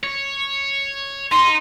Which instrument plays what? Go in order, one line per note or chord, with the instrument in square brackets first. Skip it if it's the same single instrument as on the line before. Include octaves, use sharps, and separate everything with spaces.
[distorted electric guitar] C#5
[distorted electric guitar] D#4 [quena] C6